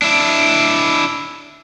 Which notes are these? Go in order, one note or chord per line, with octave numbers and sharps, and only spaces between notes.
D4 E4